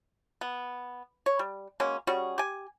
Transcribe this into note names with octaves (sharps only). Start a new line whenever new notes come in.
B3
C#5
G3
F#3 G#3 A#3 C#4
G3 C#4 F#4 G#4
G4 G#5